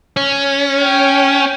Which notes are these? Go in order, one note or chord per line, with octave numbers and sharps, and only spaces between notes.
C#4
C#5 G5